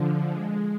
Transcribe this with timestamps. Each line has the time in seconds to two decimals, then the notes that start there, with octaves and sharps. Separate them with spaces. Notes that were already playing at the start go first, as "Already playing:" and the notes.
Already playing: D3 F3
0.29 G#3